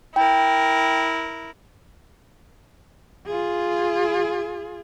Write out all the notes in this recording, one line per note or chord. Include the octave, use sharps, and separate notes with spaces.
E4 A#4 G5
F4 G#4